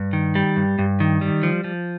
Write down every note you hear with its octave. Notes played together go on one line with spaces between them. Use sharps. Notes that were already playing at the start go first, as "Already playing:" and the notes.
Already playing: G2
D#3
G3
G2
G2
D#3
G3
F3
F3